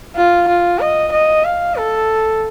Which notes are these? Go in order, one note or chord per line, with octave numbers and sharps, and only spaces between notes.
F4
F4
D#5
D#5
F5
A4